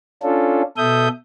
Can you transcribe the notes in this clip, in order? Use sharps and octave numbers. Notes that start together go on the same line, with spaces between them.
C#4 D4 F4 A4
B2 A4 E5 D#6 G6